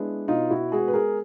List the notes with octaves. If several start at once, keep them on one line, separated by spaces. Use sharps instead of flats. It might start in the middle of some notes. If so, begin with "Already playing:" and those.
Already playing: G#3 B3 D4 E4
B2 D#4 F4
E4 F#4
G#3 B3 F#4 G#4
B4
G#4 A#4